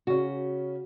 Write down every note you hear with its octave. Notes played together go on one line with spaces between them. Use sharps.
C#3 C#4 F#4